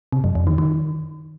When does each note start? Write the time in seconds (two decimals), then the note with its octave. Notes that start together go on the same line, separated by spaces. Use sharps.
0.12 C3
0.24 F#2
0.35 F2
0.47 D#3
0.58 D#3